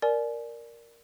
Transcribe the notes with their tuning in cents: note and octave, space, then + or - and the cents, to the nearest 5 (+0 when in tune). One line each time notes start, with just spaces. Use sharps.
A#4 +0 D5 +0 G#5 +30